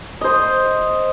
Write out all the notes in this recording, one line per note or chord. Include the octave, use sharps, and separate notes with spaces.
C5 D#5